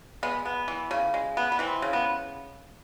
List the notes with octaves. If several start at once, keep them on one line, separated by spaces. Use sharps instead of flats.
G#3 B3
B3
E3
C#3
G#3
B3
B3
E3 C4
C#3
B3